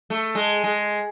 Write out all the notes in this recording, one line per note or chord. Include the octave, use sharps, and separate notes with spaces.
A3
G#3
G#3